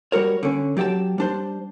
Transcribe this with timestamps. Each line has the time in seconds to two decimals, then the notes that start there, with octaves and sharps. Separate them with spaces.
0.12 G3 F#4 A#4 C#5
0.43 D3 C#4
0.77 F#3 G4 D5 G5 A5
1.18 G3 D4 C5